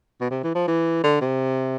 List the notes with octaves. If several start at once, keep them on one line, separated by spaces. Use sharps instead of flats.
B2
C3
E3
F3
E3
D3
C3